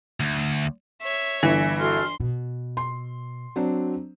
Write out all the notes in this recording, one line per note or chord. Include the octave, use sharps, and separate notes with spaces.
D2
C#5 E5
G1 E3 E5
F#4 A4 C6 F6 C7
B2
C6
F#3 C4 D4